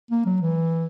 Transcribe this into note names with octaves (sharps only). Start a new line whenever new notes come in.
A#3
F#3
E3